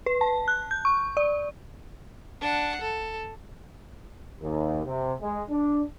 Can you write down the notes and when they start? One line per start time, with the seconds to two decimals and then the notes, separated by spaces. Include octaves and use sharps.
0.06 B4
0.21 A5
0.48 F#6
0.71 G6
0.85 C#6
1.17 D5
2.41 D4 F#5
2.81 A4
4.40 D#2
4.85 C3
5.20 G#3
5.50 D4